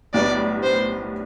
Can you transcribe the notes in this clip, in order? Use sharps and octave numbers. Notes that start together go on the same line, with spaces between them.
B1 A2 G3 B3 D4 D5
C5